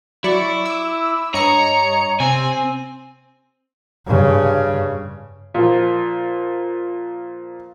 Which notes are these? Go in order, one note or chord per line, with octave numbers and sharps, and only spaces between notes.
F#3 E4 D5 C#6
D6 E6
G2 C#5 D#5 A#5 C#7
C3 C4 G#5
G2 C#3
A#2 F3